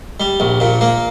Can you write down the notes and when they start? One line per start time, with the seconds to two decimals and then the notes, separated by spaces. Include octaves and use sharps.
0.20 G3
0.40 A#1
0.60 A#2
0.81 A#3